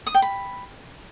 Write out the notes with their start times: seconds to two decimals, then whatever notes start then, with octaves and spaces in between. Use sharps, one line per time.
0.07 D#6
0.14 G5
0.22 B5